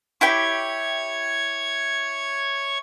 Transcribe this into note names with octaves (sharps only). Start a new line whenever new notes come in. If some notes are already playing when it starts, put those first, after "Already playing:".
E4 G4 C#5 G5 G#6